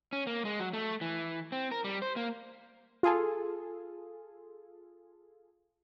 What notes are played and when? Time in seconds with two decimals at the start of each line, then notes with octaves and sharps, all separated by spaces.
0.13 C#4
0.27 A#3
0.45 G#3
0.59 F#3
0.73 A3
1.01 E3
1.52 C4
1.71 A#4
1.84 G3
2.02 C5
2.16 A#3
3.03 F4 G#4 A4